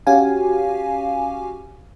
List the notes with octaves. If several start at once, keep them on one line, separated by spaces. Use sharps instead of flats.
C#4 F#4 G4 F5 G#5